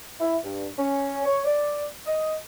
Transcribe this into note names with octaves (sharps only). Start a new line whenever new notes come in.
E4
G2
C#4
C#5
D5
D#5